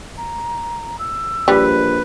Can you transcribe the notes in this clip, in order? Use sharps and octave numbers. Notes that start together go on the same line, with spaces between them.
A#5
E6
A#1 G3 B4